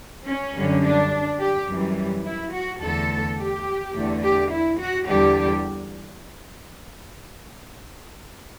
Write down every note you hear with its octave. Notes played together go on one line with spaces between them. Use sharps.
C#4
F#2 D3 G3
D4
G4
F#2 E3 G3
E4
F#4
E2 D3 A3 A4
G4
E2 D3 A3
G4
E4
F#4
E2 D3 G3 G4